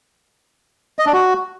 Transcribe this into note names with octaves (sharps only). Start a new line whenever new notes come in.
D#5
D4
F#4